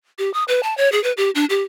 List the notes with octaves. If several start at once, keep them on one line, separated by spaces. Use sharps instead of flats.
G4
D#6
B4
A5
C#5
G#4
B4
G4
D4
G4